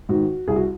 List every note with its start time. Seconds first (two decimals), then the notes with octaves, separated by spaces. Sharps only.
0.09 G#2 D#3 F#4
0.48 C2 G#4
0.56 F#4